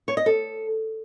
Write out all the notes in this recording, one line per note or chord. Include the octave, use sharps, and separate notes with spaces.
C#5
D#5
A4